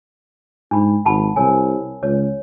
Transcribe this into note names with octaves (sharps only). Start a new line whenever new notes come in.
G#2 D4 B5
G#1 F#5 A5 B5
C2 A#4 C#5 G#5
C#2 C#5